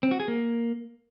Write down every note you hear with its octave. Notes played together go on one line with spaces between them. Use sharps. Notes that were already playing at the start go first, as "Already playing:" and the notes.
C4
F#4
G#4
A#3